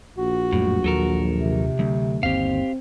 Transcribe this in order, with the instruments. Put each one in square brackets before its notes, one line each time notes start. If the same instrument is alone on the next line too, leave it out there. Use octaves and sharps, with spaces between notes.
[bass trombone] A#1 [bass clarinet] F#4
[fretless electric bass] F2 F#3 G3 [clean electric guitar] A2
[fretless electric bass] D#2 [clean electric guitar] F#3 A4 A#4
[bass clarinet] C3
[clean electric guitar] D2 [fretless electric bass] F#3 A3 D4
[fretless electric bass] G1 D#2 [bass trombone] C4 [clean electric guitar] G4 F5